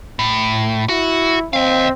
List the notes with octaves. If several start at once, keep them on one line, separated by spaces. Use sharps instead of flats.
A2
E4 F#4
C4 D#5 F5